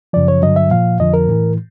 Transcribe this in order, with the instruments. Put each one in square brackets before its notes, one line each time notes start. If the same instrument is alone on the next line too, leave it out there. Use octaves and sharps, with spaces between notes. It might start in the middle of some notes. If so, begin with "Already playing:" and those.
[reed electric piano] F#2 C#3 F3 D5
C#5
G2 D3 F#3 D#5
E5
A#2 F3 F5
F2 D3 F3 D#5
A#4
A2 E3